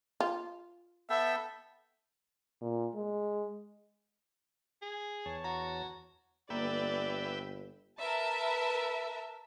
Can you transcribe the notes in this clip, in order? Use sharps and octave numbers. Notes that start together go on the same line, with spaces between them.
F4
B3 A4 E5 G5
A#2
G#3
G#4
E2 C#5 A5
F#4 A#5
G1 A#3 B4 D5 E5 G5
A#4 B4 E5 A5